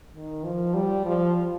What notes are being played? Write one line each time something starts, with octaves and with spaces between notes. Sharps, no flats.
D#3
F3
G3
F3